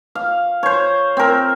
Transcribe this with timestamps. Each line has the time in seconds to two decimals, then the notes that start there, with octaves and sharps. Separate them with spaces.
0.15 F5
0.63 C5 C#5
1.17 C4 A#4